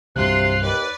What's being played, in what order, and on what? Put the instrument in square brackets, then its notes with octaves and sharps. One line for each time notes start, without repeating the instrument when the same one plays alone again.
[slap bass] C2 G2 F#3 [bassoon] C3 [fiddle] F4 C6 [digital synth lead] F#6
[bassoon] D#2 [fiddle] B4 D5